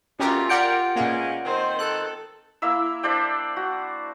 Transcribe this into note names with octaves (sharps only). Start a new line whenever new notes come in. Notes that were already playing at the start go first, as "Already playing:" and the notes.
B2 G3 A3 C#4 F4 G4 A#4
G4 A#4 D5 F#5 G6 C#7 D7
A#2 G#3 A#3 B3 C#4
D#3 C4 C5
A4 F#6
A#3 E4 E5 E6
D4 C5 D5 G5
F#4